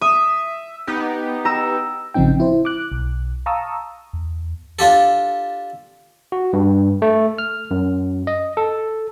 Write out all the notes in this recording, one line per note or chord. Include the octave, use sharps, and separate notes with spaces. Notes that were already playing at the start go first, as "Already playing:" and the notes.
E5 D#6
B3 D#4 G4
A#5 E6 E7
A1 C#3 F3 C4 D#4 G5
E4 C5
D6 F#6
B1
F5 A5 A#5 C#6 D#6 E6
E2
D4 F4 G4 A4
F#4
G2
A3
F6
F#2
D#5
A4